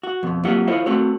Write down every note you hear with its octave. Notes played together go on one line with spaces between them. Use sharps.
F#4
F2 B2
F#3 A#3 C4 F4 G4 F#5
E4 F4 C5 C#5 D#5 F5
A3 C4 F#4 C#5